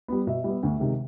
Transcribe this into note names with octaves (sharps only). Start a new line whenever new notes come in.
G3 B3
B2 E5
G3 B3
D2
C3 D#3 G#3